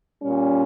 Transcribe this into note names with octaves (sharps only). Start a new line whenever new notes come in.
A#2 G3 C#4